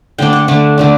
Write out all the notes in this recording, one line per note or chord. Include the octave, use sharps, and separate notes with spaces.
D3 A3 D4 G5
F#5
D3 A3 D4
D3 A3 D4